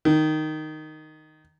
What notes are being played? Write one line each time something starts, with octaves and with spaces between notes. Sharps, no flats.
D#3